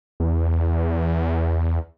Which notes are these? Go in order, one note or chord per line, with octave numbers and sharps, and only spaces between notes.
E2